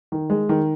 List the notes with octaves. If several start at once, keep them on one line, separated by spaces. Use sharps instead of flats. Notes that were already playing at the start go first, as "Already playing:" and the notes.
D#3
G#3
D#3